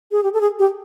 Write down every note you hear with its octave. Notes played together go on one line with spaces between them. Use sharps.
G#4
G4
A4
G#4
G4